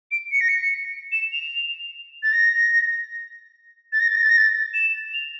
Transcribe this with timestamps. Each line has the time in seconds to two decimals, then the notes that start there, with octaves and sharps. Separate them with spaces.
0.11 D7
0.32 C#7
0.40 A#6
0.49 C#7
1.12 E7
1.32 F7
2.23 A6
2.33 A#6
3.93 A6
4.00 A#6
4.08 A6
4.15 A#6
4.22 A6
4.29 A#6
4.37 A6
4.74 E7
5.14 F7